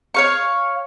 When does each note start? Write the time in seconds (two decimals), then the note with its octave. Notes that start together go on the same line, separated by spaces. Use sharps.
0.14 C#5 F5 C#6